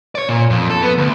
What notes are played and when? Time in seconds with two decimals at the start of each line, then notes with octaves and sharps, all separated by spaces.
0.15 C#5 D5
0.29 A#2
0.50 F2
0.70 A4
0.82 B3
0.98 D2